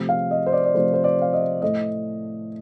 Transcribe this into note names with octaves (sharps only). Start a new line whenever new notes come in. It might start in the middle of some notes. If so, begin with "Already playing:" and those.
Already playing: C3 F3 A3
F5
D#5
C5
D5
D5
C3 F3 A3 C5
C5
D5
F5
D#5
A2 A3 D#5